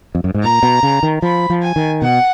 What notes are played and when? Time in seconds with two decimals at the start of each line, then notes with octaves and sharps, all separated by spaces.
0.15 F2
0.24 F#2
0.34 G#2
0.43 A#2 A#5
0.63 B2
0.83 C#3
1.03 D#3
1.22 F3 B5
1.50 F3
1.63 G#5
1.76 D#3
2.02 B2 F#5